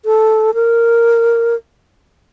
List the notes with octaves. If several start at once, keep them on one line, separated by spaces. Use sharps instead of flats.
A4
A#4